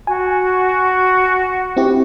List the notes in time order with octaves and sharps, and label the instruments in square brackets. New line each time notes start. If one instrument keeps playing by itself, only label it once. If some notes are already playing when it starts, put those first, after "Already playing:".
[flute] F#4 [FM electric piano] G#5
[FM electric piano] C4 E4 G4